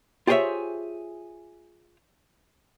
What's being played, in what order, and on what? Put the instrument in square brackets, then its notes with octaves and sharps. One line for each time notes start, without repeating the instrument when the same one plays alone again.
[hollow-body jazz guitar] F4 G4 G#4 C5 C#5 E5